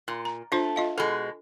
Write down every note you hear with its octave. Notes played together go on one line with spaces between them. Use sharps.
A#2
A#5
A3 D4 F4 C5
F4 D#5 F5
B2 G#3 A4 B5